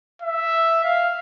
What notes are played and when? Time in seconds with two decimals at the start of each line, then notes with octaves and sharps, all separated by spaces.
0.22 E5
0.84 F5